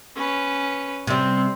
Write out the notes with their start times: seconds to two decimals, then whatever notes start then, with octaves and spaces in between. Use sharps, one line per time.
0.16 C#4 B4
1.07 C3 G3 C4